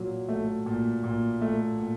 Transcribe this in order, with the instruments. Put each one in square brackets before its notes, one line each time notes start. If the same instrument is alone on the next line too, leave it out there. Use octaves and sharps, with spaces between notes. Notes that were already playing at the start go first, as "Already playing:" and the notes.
Already playing: [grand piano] A#2 F#3
A3
A#2
A#2
A3
A#2